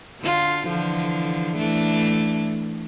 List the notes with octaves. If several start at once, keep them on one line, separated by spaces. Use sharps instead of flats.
D3 F4
D3 E3 F3
E3 A3 D4